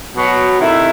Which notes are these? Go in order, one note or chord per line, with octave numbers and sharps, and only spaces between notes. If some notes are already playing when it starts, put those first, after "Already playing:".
B2 F#3 B3 F#4
C3 D#3 A3 E4